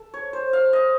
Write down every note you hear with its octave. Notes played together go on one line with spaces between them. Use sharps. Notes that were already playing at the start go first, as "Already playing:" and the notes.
Already playing: A4
C#5
C5
F5
D#5